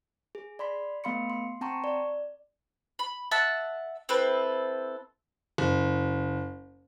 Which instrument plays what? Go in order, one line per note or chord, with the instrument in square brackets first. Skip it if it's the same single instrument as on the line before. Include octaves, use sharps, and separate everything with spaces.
[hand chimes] G#4
D5 B5 C6 B6
A3 B3 F5 B5 C6 C#7
C6
C4 G5 A5 A#5 C6 C#6
D5
[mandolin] B5
E5 F#5 A5 E6
C4 E4 A4 B4
[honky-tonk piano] F#1